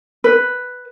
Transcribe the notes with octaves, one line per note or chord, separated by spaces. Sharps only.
B4